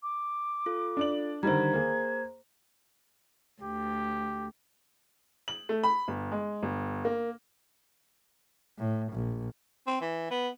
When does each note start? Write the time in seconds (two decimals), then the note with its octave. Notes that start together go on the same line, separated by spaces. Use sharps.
0.03 D6
0.66 F4 A4
0.97 D4 D5 F#7
1.43 D3 D#3 G3 C5 A#5 G#6
1.73 A#3 G#4
3.62 D2 G4
5.48 F#7
5.69 A3
5.83 B5
6.08 G1
6.32 G#3
6.63 G1
7.05 A#3
8.78 A2
9.13 A#1
9.87 C4
10.01 E3
10.31 B3